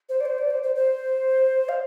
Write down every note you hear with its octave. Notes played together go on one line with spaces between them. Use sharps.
C5
D5
C5
D5
C5
C5
C5
F5